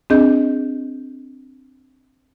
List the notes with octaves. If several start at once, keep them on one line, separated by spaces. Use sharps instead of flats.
C4 D4 G#4 D#5 G6